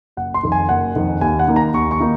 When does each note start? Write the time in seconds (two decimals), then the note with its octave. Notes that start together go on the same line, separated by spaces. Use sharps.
0.17 F#1 F#5
0.34 C6
0.43 F2 D#3
0.52 G#5
0.69 F#1 F#5
0.96 F2 D#3
1.21 D#2 G#5
1.39 F#5
1.48 D#3 A#3 D#4
1.56 A#5
1.74 D#2 C#6
1.91 C#6
2.00 D#3 A#3 D#4